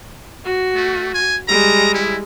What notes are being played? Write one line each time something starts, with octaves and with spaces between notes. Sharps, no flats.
F#4
A3
G#5
G3 G#3 A#5
E4